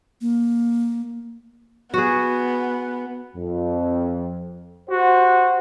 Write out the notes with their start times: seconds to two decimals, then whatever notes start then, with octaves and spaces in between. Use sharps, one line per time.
0.21 A#3
1.94 B3 F#4 G#4
3.36 F2
4.90 F#4 G4 C5 F#5